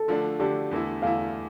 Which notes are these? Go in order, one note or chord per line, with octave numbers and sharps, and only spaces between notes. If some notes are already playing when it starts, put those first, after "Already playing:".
Already playing: A4
D3 F3 A3 D4
D3 F3 A3 D4 G4
E2 D3 A3 E4
E2 D3 A3 E4 F5